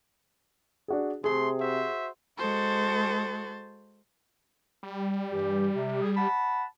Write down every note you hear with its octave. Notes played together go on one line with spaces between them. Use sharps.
D4 F#4 G#4
C3 A3 G#4 C6
F#4 C5 E5
G#3 F#4 A4 C5 A6
G3
G2 E3 G4
C3
G#4
F#5 A5 B5